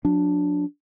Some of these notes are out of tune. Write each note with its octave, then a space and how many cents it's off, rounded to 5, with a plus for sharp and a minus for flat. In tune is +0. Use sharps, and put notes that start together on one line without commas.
F#3 -35 D4 +0